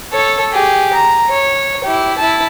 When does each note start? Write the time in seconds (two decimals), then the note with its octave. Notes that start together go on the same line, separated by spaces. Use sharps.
0.12 A4 C#5
0.52 G4 G#4
0.93 A#5
1.30 C#5
1.84 E4 G4
2.18 E4 A5